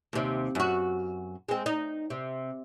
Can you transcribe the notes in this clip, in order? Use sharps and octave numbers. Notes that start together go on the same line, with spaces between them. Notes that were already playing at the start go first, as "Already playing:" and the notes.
D#2 C3
F#2 F#4
G#3 C4
D#4
C3